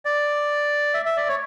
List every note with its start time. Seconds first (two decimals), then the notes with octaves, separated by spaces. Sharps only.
0.05 D5
0.94 E5
1.05 E5
1.17 D5
1.29 C#5